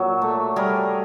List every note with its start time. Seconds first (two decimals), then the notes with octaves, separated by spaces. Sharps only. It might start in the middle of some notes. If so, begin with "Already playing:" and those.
Already playing: A#2 F#3 D5 E5
0.22 A3
0.56 G3 G#4 A#4